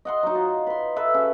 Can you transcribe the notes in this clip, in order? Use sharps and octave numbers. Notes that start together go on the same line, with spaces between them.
D#5 F#5 C6
F#3 D#4
F4
B4 C6
A4 B4 E5
C#3